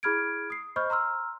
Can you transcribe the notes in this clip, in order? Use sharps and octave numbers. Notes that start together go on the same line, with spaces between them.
E4 G#4 B5 F6 G#6 D7
D#6 C7
C5 D#5 B5 C#6 F6 G6
A#5 C6 E6 F6